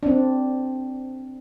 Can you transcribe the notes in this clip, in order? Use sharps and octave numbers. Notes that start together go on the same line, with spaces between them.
C4 D4